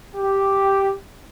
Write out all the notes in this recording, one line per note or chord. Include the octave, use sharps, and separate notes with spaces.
G4